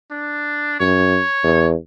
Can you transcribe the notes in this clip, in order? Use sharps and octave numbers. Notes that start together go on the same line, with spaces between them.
D4
F#2 C#5
E2